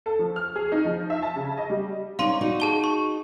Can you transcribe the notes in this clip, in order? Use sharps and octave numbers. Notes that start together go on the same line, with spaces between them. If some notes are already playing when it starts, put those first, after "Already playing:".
A4
F3
F6
G#4
D#4
F3
E5
A5
C#3
D#5
G3
C#4 D#4 D5 F5 C6 D#7
D#4 F#4
G#4 A5 G7
C#6